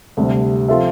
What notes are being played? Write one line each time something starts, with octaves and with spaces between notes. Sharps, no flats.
D2 C3 G3
F3 C4 F4 A4 E5